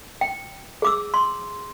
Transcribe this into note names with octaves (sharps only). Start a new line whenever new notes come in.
G5
G#4 D6 E6
C6